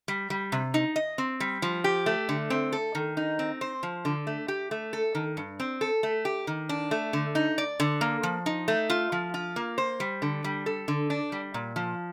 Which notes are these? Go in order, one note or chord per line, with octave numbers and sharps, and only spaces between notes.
G3
G3
C3
D#4
D#5
C4
G3
F3
G4
A3
D3
C4
A4
D#3
D#4
C4
C5
F3
D3
A3
G4
A3
A4
D#3
G2
C4
A4
A3
G4
D#3
D4
A3
D3
D#4
D5
D3
A#3
F3
D#4
A3
F4
F3
F4
A#3
C5
G3
D3
G3
A4
D3
D4
G3
A#2
F3